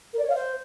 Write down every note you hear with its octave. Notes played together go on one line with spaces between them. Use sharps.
A#4
D5
C#5
F5
C5